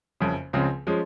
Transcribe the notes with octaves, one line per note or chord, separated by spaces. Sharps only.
F#1 F2 C#3
C#2 C#3 F3 G#3 C4
F3 G#3 C#4